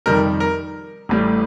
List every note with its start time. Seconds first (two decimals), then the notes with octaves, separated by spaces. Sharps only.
0.06 F2 C3 D#3 G3 A#4
0.40 A#4
1.09 A1 A2 G3